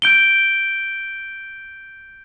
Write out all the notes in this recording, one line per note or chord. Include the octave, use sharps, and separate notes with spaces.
G6 D7 G7